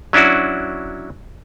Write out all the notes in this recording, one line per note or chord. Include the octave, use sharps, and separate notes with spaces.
F#3 C#4 D4 E4 F#4